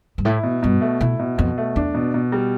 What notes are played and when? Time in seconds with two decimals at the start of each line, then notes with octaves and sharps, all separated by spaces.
0.18 G2
0.25 A2 E4
0.43 B2
0.63 G2 B2
0.81 A3
1.01 B2 E4
1.19 B2
1.38 F2 B2
1.58 A3
1.76 E2 D4
1.94 B2
2.14 B2
2.32 G3